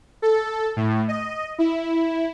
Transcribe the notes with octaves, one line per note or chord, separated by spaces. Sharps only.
A4
A2
D#5
E4